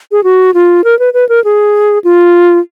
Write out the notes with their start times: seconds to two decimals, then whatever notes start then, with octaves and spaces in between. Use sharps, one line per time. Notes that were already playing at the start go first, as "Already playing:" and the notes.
0.12 G#4
0.24 F#4
0.54 F4
0.84 A#4
0.99 B4
1.14 B4
1.29 A#4
1.44 G#4
2.04 F4